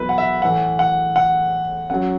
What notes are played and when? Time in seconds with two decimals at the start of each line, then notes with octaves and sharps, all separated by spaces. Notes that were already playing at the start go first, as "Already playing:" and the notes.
Already playing: E2 B2 F#3 E4 B4
0.09 F#5
0.18 E5
0.42 A2 E3 F#5
0.79 F#5
1.16 F#5
1.90 F#2 F#3 F#5